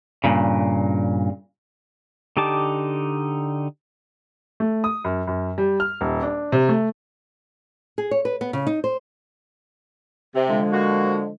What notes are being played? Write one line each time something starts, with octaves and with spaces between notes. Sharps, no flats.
G2 A#2 C#3
D3 D#4 G4 A5 D6
A3
D#6
F#2
F#2
G3
F6
D#1
D4
C3
A3
G#4
C#5
B4
B3
C#3
D#4
C5
C3
D3 F3 G#3
A#3 F#4